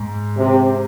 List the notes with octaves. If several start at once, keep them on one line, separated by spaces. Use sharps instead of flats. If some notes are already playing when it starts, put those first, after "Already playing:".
Already playing: G#2
C3